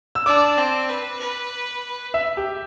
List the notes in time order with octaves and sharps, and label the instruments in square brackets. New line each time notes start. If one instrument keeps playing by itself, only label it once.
[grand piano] E6
[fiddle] D4 [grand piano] D6
[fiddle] C4
B4
B4
[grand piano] E5
G4